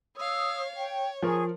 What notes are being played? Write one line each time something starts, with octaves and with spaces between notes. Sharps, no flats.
C#5 F5 D#6 E6
C#5 G5
F3 G#4 A#4 C#6